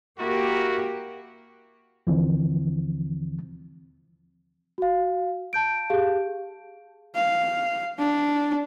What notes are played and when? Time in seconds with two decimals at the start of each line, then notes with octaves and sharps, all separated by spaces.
0.19 A#3 E4 F#4 G4 A#4
2.07 D#2 D3 E3 F3 C4
4.78 F#4 F5
5.53 A5 G6 D7
5.90 G4 G#4 F5
7.15 F5
7.99 D4